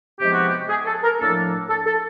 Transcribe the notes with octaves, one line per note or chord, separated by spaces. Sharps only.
C3 F3 G#3 B3 D#4 G4
F#4
G4
G#4
A4
A#4
A2 F3 A#3 D4 A4
A4
A4